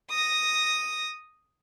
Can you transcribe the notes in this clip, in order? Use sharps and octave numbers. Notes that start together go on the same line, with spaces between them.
D#6 A#6